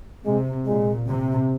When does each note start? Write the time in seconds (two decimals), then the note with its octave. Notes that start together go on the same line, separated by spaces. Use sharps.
0.25 C3 G#3
0.66 A#2 G#3
1.08 C3